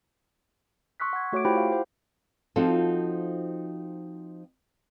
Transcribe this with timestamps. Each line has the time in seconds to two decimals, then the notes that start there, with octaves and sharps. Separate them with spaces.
1.00 C6 C#6 E6 F#6 B6
1.13 F#5 G#6
1.32 A3 F#4 C#5 F#5 D6 D7
1.45 E4 F4 G4 C5 G5 B5
1.57 F5
1.72 C5 F#5
2.56 F3 C4 D#4 F4 F#4 A4